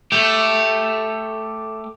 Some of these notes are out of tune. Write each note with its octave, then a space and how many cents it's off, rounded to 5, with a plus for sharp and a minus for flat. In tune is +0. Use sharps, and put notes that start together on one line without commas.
A3 +0 G4 +0